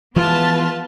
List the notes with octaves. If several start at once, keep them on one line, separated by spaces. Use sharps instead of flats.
E3 F3 G#3 B3 F4 B4 A5